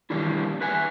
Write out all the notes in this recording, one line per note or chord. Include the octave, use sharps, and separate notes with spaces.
D#3 E3 G3 A#3 D4 E4
B4 E5 F#5 G#5